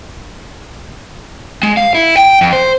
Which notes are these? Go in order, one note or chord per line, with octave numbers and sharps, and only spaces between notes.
G#3
F5
E4
G5
F2
C5